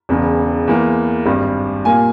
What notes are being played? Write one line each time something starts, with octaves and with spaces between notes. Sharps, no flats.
E1 E2 C#3
E2 E3 A#3
G#1 G2 G3
A#2 G3 A#3 G#5